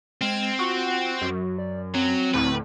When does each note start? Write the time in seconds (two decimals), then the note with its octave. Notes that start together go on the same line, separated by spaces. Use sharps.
0.21 G#3 C4 F6 G#6
0.59 F4 F#4
1.22 F#2 F#4
1.59 D5
1.94 F#3 C4
2.34 D2 A2 B4